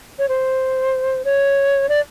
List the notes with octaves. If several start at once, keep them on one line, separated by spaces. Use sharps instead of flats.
C#5
C5
C#5
D5